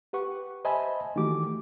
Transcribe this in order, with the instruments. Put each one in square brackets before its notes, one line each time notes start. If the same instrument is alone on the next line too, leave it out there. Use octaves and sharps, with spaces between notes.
[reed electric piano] G4 B4 F#5 C#6
C5 D#5 E5 G#5 A5 B5
D#3 E3 A3 F#4 G4 D6